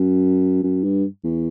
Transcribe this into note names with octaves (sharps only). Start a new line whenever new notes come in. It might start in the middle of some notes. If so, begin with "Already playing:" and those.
Already playing: F#2
F#2
G2
E2